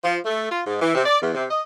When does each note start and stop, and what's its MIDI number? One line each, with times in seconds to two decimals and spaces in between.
0.03 0.18 53
0.25 0.51 57
0.51 0.60 65
0.67 0.80 44
0.82 0.92 52
0.94 1.03 48
1.06 1.20 74
1.21 1.33 40
1.34 1.44 48
1.51 1.62 75